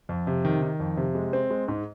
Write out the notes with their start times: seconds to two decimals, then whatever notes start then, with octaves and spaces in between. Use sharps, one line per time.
0.09 F2
0.27 C3
0.45 D#3
0.62 D#3
0.80 F2
0.97 C3
1.15 G#3
1.33 C4
1.50 G#3
1.68 G#2